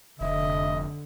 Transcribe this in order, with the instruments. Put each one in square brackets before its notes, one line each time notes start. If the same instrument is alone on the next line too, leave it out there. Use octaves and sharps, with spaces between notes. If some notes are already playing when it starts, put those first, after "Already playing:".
[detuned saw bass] F1 [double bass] D3 [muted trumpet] D#5 [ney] E5